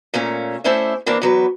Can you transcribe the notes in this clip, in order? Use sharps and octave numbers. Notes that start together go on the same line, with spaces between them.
A#2 A3 A#3 C#4
A3 C#4 E4 C5 D5 E5
E3 A#3 C4 D4
E2 F#3 B4